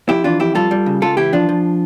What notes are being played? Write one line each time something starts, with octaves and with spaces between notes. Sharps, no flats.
F2 E4 G4
E3 D4 F4
F2 E4 G4
G3 F4 A4
G3
C#3
C#2 F4 A4
E3 E4 G4
F3 D4 F4
F3